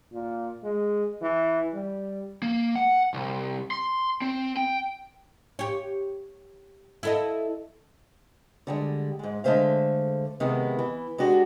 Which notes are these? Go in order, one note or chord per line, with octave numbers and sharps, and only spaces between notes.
A#2
G#3
E3
G3
A#3
F#5
C2
C6
C4
G5
G4 C#5
E4 A4 D#5
D3 G3 G#3
G#2 G#3
D3 G#3 A3 C5 E5 F5
C3 D#3 G#3 B3 E4
E3
G#3 D4 F#4 G4